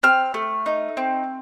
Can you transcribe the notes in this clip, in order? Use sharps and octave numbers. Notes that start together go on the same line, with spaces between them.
C4 F6
A3
D#4
C4